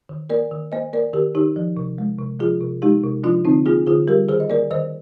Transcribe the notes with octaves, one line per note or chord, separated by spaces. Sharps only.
D#3
A#3 A#4 D5
D#3
A#3 C5 D#5
A#3 A#4 D5
D#3 G4 A#4
D#3 D#4 G4
F3
C3
G#3
C3
F3 F4 G#4
C3
G#3 D#4 G4
C3
F3 D4 F4
D3 C4 D#4
A#3 F4 G#4
D3 F4 G#4
G3 G4 A#4
D#3 G#4 C5
D#5
A#3 A#4 D5
D#3 C5 D#5